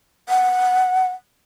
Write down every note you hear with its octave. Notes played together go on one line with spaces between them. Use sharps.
F#5